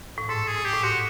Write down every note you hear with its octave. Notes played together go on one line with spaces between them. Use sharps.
A2
G#2 A4
G#4
G4
A2
G#2 F#4